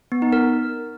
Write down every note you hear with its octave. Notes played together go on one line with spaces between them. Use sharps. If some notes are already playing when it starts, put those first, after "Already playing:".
B3
D#4
A#4